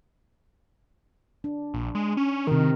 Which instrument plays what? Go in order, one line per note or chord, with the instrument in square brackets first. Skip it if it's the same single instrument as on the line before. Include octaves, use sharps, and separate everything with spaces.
[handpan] D4
[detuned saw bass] A#1
G#3
C#4
[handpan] C3 D#4 A#4 [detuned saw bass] D#3